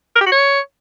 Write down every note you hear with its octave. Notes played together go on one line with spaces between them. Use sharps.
A#4
G4
F#4
C#5